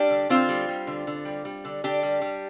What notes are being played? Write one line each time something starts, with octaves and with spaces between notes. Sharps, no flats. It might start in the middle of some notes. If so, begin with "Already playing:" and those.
Already playing: G3 D4 G4
D3
D3 C4 F4
G3
G3
D3
D3
G3
G3
D3
D3 D4 G4
G3
G3